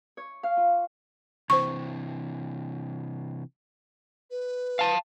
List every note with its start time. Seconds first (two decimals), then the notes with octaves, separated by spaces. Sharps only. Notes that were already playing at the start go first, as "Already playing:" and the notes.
0.17 C#5
0.43 F5
0.57 F4
1.50 C3 E3 C5 C#6
4.30 B4
4.79 F5 A5